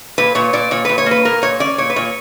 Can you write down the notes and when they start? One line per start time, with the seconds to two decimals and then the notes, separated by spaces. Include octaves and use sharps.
0.18 A#2 B4
0.35 A#2 C#5
0.53 A#2 D5
0.71 A#2 C#5
0.85 A#2 B4
0.98 C#5
1.06 A#3 B4
1.25 A#2 A#4
1.42 A#2 C#5
1.60 C#4 D5
1.78 A#2 C#5
1.90 B4
1.96 A#2 C#5